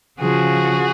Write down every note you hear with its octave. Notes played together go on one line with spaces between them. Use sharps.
C#3 F3 F#4 G#4